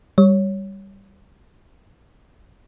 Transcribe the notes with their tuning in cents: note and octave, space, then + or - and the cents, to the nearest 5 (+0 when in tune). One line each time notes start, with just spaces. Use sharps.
G3 +0 C#5 +0